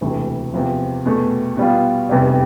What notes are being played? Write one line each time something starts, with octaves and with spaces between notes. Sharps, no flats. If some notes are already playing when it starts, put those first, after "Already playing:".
E1 D2 C3 E3 A3
E2 C3 F3
E2 B2 A3
B2 G3 B3 F4
F1 E2 C3 G3